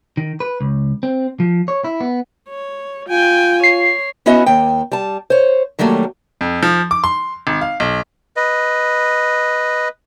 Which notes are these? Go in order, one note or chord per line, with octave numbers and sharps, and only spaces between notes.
D#3
B4
C#2
C4
F3
C#5
E4
B3
C#5
F4 G5 G#5
C#5 C7
B3 C#4 E4 F#4 D#5
D#2 G5
G3 A5
C5 C#5
D#3 F#3 G3 A3 A#3
F2
F3
D6
C6
G#1
F5
B1
B4 D#5